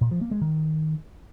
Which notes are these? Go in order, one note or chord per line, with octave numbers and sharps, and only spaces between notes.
A#2
F3
A#3
G#3
D#3